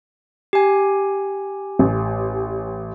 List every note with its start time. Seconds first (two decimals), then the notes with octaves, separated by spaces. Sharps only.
0.53 G4 G#5
1.79 A1